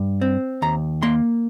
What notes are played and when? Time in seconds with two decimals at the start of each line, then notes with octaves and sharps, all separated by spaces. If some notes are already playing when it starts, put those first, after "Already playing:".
Already playing: G2
0.21 C4
0.62 D#2 A#5
1.03 A#3 C6